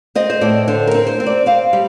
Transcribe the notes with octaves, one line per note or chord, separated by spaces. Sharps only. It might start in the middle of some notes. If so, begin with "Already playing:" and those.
C4 D#5
C5
A2 D5
D3 C5
A#4
C4
C5
C4
D5
C4 F5
G3